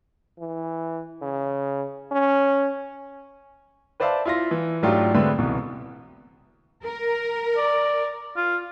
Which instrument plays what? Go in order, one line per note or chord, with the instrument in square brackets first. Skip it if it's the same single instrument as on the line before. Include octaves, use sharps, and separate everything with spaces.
[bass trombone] E3
C#3
C#4
[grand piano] B4 C5 D5 E5 F5 A5
E4 F4 C6 A#6
E3
G#2 F#3 A3 D4 F4 G4
D3 G#3 A3 C4 B4 B5
C2 B2 E3
[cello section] A#4
[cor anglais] D5
F4